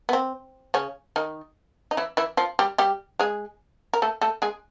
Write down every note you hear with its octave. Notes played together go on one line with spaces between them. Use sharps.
B3
C4
C#3 C#4
D#3 D#4
D#4
E3 E4
E3 E4
F3 F4
G3 G4
G3 G4
G#3 G#4
A#4
A3 A4
A3 A4
G#3 G#4